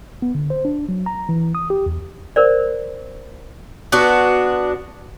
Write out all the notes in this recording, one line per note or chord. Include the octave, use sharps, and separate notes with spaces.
B3
D3
C5
D4
F#3
A#5
E3
D#6
G4
E2
A#4 C5 D5
B3 D4 F#4